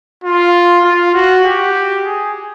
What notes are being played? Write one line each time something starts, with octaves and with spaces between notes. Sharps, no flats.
F4
F4
F#4
G4
G#4